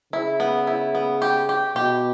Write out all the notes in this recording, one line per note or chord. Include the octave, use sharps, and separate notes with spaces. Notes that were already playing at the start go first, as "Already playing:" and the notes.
C#3 E4
B3
E4
B3
G4
G4
B2 G4